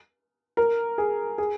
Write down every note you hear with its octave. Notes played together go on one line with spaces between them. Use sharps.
A#4
G#4
G#4